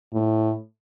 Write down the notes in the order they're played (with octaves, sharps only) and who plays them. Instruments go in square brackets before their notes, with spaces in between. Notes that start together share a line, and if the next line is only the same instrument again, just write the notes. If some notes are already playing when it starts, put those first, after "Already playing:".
[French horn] A2